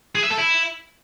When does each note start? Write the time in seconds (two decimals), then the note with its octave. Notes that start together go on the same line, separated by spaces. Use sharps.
0.15 G#4
0.23 E5
0.30 A4
0.38 E4